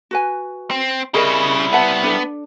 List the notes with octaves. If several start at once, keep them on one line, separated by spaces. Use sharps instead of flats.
F#4 B4 G#5
C4
C#3 G3 E4 G#4 A#4 D#5
B3 E5 F#5 A5
D4 A4